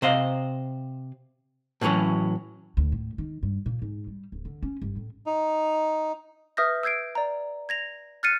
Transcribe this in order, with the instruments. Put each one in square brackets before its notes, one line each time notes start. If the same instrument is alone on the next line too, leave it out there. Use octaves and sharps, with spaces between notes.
[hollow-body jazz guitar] C3 C5 D#5 F5
A2 D3 E3 F#3 C#4
[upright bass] D2
A2
D#3
G2
A#2
G#2
G3
D1
D3
C#4
G1
A2
[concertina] D#4
[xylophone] B4 E5 D#6 F6 G6 A#6
E6 G6 G#6 C7 D7
D5 A#5
G#6 A#6 F7
F6 F#6 A6 C7 C#7 D#7